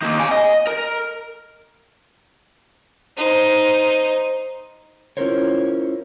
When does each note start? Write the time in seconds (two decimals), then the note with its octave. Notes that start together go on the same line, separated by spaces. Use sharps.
0.03 D#3 A#3
0.20 F5 G#5
0.31 D#5
0.67 A#4
3.17 D#4 C5
5.17 C#4 E4 F4 A#4 C5 C#5